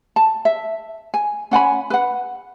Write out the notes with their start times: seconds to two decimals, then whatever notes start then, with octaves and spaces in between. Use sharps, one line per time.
0.16 A5
0.45 E5
1.14 G#5
1.51 C#4 F#5 G#5 B5
1.90 B4 F#5